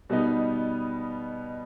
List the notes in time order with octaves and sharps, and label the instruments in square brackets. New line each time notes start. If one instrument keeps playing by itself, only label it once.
[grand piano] B2 G3 B3 D#4